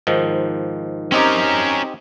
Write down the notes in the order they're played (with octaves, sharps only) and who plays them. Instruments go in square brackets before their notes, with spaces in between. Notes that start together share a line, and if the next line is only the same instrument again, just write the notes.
[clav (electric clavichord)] G#2 D#3 F3
[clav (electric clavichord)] C4 D#4 G4 [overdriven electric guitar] C#4 A#4